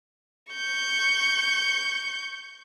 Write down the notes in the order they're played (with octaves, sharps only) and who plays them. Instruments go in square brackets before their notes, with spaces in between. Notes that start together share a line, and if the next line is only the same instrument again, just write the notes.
[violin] C#6 G6